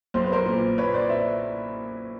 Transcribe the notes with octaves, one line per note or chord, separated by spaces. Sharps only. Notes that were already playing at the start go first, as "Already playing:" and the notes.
B1 C5
B4
A#4 C5
A#2
A#2 B4 C#5
C5 D5
D5 E5